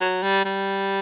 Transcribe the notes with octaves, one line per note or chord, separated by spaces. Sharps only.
F#3
G3
G3